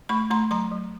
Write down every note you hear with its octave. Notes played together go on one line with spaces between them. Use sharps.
A3 B5 C#6
A3 A#5 C6
F#3 A#5 C6
F#3